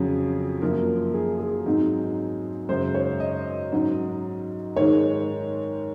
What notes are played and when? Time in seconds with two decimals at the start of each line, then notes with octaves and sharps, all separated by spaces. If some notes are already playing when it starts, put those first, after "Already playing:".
Already playing: F2 C#3 F#3 C#4 G#4
0.61 F#2 F3 A#3 A#4
1.14 G#4
1.40 G#4
1.66 G#2 F#3 C4 D#4
2.69 F#2 C#3 G#3 C5
2.95 C#5
3.20 D#5
3.72 G#2 F#3 C#4
4.76 G#2 D#3 G#3 C#5